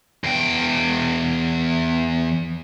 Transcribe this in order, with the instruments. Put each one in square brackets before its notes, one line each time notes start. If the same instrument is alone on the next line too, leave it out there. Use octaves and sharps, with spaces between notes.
[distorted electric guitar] E2 G5